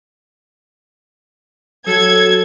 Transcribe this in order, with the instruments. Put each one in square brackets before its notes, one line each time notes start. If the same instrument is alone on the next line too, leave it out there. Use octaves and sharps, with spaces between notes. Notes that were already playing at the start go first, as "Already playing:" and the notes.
[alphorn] F#3 [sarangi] A4 [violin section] G#6